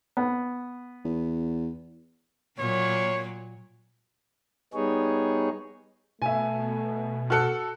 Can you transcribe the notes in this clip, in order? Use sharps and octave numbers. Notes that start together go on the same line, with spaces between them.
B3
E2
A#2 F#3 A#3 C#5
G3 B3 D#4 G#4 C#5
B2 A3 E5 G#5
F#4 A4 F6 F#6 C#7